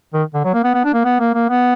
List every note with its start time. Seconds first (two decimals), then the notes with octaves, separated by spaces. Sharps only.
0.14 D#3
0.34 D3
0.45 F#3
0.54 A#3
0.64 B3
0.74 B3
0.85 D4
0.94 A#3
1.05 B3
1.20 A#3
1.34 A#3
1.50 B3